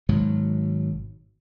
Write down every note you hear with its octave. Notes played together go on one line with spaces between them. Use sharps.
G#1 G#2 B2 F#3